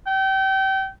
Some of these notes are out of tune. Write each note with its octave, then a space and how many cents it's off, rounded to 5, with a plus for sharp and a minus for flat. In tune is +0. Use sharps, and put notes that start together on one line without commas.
G5 -30